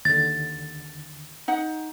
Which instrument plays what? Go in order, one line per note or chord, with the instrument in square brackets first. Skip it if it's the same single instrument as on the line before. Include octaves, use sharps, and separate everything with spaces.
[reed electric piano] D#2 D3 [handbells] A6
[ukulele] D#4 F#5